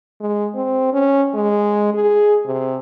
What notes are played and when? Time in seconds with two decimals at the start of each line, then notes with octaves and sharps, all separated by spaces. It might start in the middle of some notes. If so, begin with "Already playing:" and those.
0.21 G#3
0.55 C4
0.93 C#4
1.34 G#3
1.94 G#4
2.46 C3